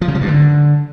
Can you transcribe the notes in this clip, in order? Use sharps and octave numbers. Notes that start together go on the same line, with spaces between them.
F3
C#3
G3
G2
D3